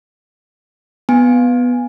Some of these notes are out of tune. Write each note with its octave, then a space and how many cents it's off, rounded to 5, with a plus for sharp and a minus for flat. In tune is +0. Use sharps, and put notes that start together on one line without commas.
B3 +0 G#5 -15